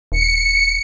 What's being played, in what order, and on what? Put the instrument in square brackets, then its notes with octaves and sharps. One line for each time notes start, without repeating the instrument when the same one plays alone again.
[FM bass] D#1 [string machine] C#7